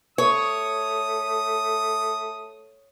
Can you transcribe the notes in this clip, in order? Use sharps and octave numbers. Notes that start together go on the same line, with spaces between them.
A3 C#5 D#6